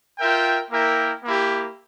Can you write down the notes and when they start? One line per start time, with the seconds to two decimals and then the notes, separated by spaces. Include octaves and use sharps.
0.19 F4 A#4 E5 G5
0.71 A#3 E4 A#4 E5 G5
1.24 A#3 E4 G4